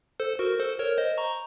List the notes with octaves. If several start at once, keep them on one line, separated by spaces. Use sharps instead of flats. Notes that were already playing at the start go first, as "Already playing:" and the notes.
A4 C5
F#4 A#4
A4 C5
A#4 C#5
C5 D#5
A#5 C#6